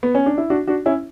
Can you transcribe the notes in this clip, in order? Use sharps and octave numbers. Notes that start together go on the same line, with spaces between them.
B3
C#4
D4
E4
D4 F#4
D4 F#4
C#4 E4